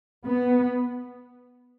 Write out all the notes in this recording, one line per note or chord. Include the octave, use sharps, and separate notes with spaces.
B3